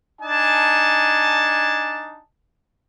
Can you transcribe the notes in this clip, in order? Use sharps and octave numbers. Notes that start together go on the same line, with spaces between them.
D4 D#4 G#5 A5